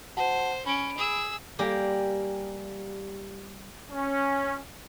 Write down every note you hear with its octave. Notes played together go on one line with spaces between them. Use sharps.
F#4 C5 F#5 A5
C#4 B5 D7
G#4 E6
G3 A#3 G4 G#5 D6
C#4